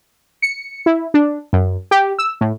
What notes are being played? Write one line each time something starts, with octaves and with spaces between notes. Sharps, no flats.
C#7
E4
D4
F#2
G4
E6
A2